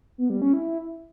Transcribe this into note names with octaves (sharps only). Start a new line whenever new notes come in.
B3
G3
C#4
E4